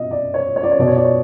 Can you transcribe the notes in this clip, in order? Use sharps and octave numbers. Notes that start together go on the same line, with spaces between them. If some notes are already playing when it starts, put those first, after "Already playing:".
Already playing: B2 D#5 E5
D5
C#5
C#5
D5
C#5
B2 D5
C#5
D5
C#5